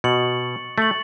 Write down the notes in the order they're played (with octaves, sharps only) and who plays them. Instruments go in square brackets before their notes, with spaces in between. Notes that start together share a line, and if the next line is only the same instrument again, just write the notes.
[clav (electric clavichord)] B2 [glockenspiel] C#6 A6 C#7 F#7
[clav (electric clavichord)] A3 [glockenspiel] C#6 A6 C#7 F#7